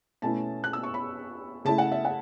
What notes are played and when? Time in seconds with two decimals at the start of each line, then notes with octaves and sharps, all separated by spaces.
0.22 B2 A3 C#4 E4 A5
0.64 F#6
0.73 E6
0.83 C#6
0.94 B5
1.65 C#3 A3 E4 A5
1.78 F#5
1.92 E5
2.05 F#5